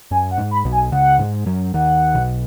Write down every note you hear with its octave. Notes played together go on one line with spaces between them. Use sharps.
F#2 G#5
F#5
G#2
B5
B1 B2
G#5
C#2 C#3 F#5
G#2 G#3
F#2 F#3
D#2 D#3 F#5
B1 B2